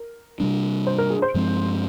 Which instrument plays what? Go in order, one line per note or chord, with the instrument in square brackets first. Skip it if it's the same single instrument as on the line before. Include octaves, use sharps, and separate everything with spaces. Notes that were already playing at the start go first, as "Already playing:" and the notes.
Already playing: [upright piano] A#4
[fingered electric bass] C3 G3 D4
[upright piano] C5
A#4
G#4
C5
[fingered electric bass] G2 F3 G#3 C4